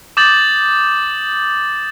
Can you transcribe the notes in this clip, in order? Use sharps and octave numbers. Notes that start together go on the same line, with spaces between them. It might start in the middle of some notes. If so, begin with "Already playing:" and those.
D6 D#6 G6 A6 F#7